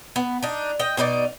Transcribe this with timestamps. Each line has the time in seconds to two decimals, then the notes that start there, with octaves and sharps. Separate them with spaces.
0.16 B3
0.43 D4 D#4
0.79 D#5 G5
0.97 B2 D4 D#4 D5